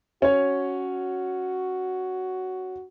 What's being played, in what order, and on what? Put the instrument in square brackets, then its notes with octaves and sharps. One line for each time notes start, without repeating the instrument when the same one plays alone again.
[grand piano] C#4 C#5 [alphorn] F#4